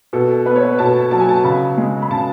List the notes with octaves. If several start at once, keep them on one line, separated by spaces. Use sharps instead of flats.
B2 A4
B3 B4
C#5
B4
B2 A5
F#3 A5
G#5
A5
C#3 B5
G#3
B5
C#3 A5